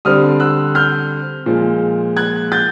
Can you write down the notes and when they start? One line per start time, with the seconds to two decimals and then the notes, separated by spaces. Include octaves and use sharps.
0.05 D3 G3 C4 D#6 F6
0.40 E6 F#6
0.75 F6 G6
1.46 A#2 F3 G#3
2.17 F#6 G#6
2.52 G6 A6